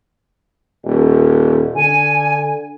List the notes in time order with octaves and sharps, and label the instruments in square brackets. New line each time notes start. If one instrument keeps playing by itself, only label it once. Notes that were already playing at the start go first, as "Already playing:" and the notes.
[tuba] D#1
[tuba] D3 [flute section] G#5